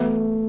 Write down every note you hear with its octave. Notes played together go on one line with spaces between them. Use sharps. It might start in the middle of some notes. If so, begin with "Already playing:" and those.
Already playing: E3 A3 B3 F#4 B4 E5